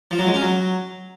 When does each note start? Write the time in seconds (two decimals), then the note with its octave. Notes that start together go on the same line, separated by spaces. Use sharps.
0.11 F3
0.19 F#3
0.26 G#3
0.34 C#4
0.42 F#3